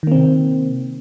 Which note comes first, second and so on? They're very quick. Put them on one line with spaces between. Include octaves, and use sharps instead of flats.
D#3 A#3 C4 C3